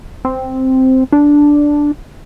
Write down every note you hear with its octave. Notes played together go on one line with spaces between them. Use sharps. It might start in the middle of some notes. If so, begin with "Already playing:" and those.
C4
D4